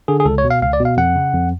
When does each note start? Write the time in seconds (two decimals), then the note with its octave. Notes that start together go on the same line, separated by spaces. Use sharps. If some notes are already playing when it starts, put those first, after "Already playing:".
0.08 D3 G#4
0.20 G#4
0.25 C#2 A4
0.38 C#5
0.44 B2
0.50 F5
0.62 C#2 F5
0.73 D5
0.80 B2
0.85 F5
0.97 F2 F#5
1.16 C#3
1.34 F2